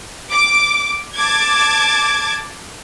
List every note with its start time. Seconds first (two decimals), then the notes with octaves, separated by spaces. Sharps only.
0.34 D6
1.17 A5 D6 G#6